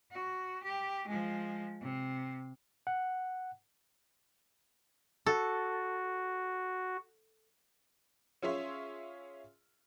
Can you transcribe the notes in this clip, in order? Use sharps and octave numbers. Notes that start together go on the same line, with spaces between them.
F#4
G4
F3 G#3
C3
F#5
F#4 A4
C#4 F4 G#4 C#5 E5 C6